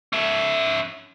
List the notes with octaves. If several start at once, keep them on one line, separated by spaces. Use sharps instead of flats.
C#4 E5